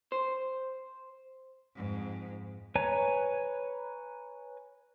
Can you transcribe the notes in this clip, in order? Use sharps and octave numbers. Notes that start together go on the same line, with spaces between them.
C5
F2 G#2
B4 C#5 G#5 A#5